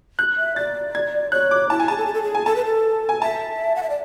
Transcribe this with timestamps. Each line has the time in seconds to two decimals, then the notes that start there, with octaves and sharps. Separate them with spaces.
0.19 F#6
0.37 E5
0.56 D5 A6
0.95 G#6
1.32 C#5 F#6
1.51 D6
1.70 E4 A5
1.80 G#5
1.88 G#4 A5
1.97 A4
2.06 G#4
2.14 A4
2.22 G#4
2.35 G#5
2.46 A4 A5
2.56 B4
2.65 A4
3.09 G#5
3.22 E5 A5
3.76 F#5
3.83 E5
3.90 D5